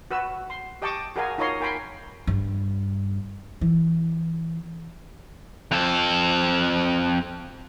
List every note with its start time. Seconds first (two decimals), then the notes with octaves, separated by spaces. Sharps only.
0.11 F#4 B4 E6
0.50 C6
0.82 G4 D#5 G5 A5 C#6 D6
1.16 F#4 G#4 A#4 D#5 F5 G#5
1.38 D#4 F4 A#4 C#5 D#5 C6
1.61 A#4 G5 G#5 B5 C6
2.27 G2
3.61 E3
5.71 F2 A4